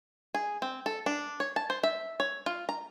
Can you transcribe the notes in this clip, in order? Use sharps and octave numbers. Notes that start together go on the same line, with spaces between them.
G#4
C4
A4
D4
C#5
A5
C5
E5
C#5
F4
A#5